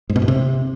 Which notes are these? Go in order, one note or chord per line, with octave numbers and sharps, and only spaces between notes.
G#2
B2
A2
C3